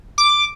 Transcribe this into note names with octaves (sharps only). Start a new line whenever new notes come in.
D6